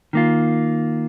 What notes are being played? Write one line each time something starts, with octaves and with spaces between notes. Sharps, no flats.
D#3 A#3 F4